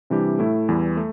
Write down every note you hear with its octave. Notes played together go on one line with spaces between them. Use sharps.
C3 E3 G3 D4 G4
A2 A3 E4
E2 E3 G3 E4
A3